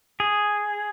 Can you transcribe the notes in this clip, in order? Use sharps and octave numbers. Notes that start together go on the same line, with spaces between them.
G#4